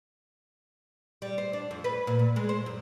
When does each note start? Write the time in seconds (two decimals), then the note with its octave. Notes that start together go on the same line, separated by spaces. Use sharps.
1.22 G3
1.38 C5
1.53 D4
1.71 F2
1.84 B4
2.07 A#2
2.19 A#2
2.36 G#3
2.49 C5
2.66 F#2